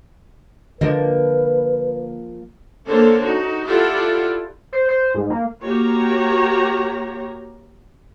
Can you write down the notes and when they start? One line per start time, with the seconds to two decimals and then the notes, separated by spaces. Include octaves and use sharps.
0.81 D3 F3 A#3 B4 D#5
2.87 D3 A#3 A4 C5 C#5
3.23 D#4 F#4
3.65 E4 F4 G4 A4 D5 F#5
4.73 C5
4.89 C5
5.15 G#2
5.30 A#3
5.63 A#3 F#4 G4 C#5 A#5